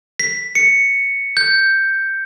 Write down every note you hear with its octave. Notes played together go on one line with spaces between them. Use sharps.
B6
C#7
G6